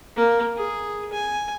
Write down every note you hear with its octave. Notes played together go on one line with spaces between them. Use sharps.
A#3
G#4
G#5